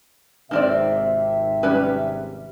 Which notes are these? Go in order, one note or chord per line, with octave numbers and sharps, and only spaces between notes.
G#1 C3 D#3 C4 D5 E5
G3 C#4 B4